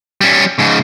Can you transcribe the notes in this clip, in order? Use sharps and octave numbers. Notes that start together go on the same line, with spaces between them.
G3 C#4
G#2 C#3